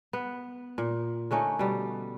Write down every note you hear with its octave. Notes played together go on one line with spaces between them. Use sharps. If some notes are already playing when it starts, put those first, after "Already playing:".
B3
A#2
D3 A3 C#4 D#4
B2 G3